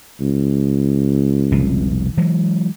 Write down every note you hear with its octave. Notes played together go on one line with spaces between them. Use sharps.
C#2
F1 C2 B2
E3 F#3 G#3